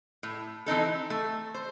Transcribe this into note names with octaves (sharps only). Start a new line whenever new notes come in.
A2
E3 C4 D#4 A4
A3
C5